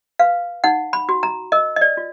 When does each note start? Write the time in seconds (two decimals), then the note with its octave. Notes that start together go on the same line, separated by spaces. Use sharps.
0.19 B4 F5
0.64 D#4 F#5
0.93 B5
1.09 F#4
1.23 A#5
1.52 A#4 D#5
1.76 D#5
1.81 D5
1.97 F4